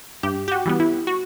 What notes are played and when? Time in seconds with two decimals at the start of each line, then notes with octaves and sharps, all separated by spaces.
0.23 G2 G4
0.48 G4
0.51 F#4
0.66 E3 G3 B3
0.80 E4
1.07 F#4